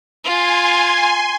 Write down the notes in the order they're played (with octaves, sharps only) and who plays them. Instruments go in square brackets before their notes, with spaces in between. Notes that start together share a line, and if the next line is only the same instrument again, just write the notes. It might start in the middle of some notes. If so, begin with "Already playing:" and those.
[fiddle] F4 [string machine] G#5 C6